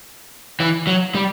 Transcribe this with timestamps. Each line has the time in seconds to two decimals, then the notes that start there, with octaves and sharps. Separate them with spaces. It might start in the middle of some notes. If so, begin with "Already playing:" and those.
0.60 E3
0.87 F#3
1.15 G3